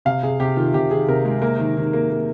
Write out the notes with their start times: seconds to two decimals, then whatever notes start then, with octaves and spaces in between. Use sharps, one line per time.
0.05 C3 F5
0.23 C3 G#4
0.40 C3 G4
0.57 D#3 F4
0.74 C3 G4
0.91 D#3 G#4
1.08 C3 A#4
1.25 G#3
1.42 A#3 A#4
1.59 D#3
1.77 D#3
1.93 A#3
2.10 A#3